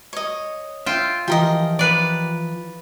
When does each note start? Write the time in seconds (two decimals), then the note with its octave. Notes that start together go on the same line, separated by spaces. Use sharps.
0.13 C#5 D#5
0.86 F4 E5 G5
1.28 E3 F3 G4 A#4 D#5
1.79 B4 D5